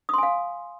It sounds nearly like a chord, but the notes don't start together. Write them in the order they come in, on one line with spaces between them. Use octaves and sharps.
D#6 C6 G#5 F5